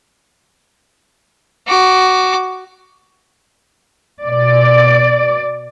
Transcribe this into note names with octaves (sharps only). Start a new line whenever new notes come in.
F#4 D6
B2 D5